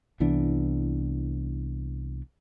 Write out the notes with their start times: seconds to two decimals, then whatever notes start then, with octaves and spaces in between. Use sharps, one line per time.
0.20 C2 E3 B3 D4